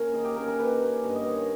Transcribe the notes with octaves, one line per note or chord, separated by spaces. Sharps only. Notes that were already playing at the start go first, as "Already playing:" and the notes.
Already playing: A#3 C#4 A#4
D#3 G#4
G4
A#3 C#4 A#4
A#4
D#3 B4
A#3
C#4
G2 D#5
D#5
D#3 A#3 C#5
C#5